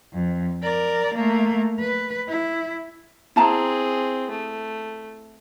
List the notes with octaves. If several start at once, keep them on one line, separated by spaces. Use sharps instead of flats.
F2
A#4 D5
A3 A#3
B4
E4
C4 E4 G#4 A5 A#5
A3